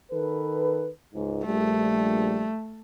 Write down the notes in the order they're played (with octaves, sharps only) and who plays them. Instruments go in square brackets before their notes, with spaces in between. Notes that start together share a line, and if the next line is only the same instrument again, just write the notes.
[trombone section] D#3 A4 B4
C#2 G#2
[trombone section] A#1 G3 [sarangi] A3